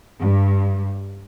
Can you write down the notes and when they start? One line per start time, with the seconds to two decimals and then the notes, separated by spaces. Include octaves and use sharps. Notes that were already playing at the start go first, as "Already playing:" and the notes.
0.21 G2